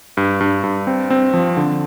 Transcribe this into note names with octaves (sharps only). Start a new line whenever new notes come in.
G2
G2
G2
C4
C4
F3
D3